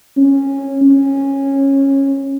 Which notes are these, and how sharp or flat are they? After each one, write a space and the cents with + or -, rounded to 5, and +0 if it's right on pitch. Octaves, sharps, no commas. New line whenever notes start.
C#4 -15
C#4 -15